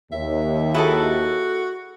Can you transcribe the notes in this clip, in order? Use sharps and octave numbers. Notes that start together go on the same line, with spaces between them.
D#2 E5
E4 F#4 G#4 A4